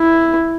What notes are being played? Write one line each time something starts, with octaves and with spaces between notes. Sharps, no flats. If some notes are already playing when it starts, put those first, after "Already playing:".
Already playing: E4